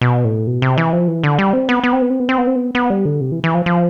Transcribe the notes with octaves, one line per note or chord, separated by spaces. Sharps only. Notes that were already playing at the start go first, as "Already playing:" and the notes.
B2
A2
B2
C3
E3
F3
E3
D3
G3
C4
B3
B3
C4
B3
C4
B3
C4
B3
C4
B3
B3
G3
D3
C3
E3
E3
F3
F3